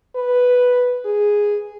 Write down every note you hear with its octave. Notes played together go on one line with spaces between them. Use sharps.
B4
G#4